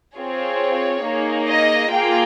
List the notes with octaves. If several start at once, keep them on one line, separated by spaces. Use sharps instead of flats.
C4 F4 G#4 C#5
A#3 D#4 G#4
D#5
A#3 F4 G#4 G5